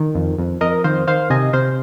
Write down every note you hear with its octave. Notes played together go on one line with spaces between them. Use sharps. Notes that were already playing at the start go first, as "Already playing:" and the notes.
Already playing: D#3
F2
F2
F2 A#4 D#5
D#3 C5 F5
D#3 C5 F5
C3 D#5 G#5
C3 C5 F5